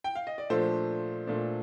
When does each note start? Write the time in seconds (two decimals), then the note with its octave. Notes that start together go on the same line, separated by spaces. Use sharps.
0.04 G5
0.15 F5
0.27 D#5
0.38 D5
0.50 A#2 F3 A3 D4 A4 C5
1.27 A#2 A3 D4